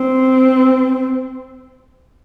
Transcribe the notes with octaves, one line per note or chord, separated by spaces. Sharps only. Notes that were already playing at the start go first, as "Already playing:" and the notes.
Already playing: C4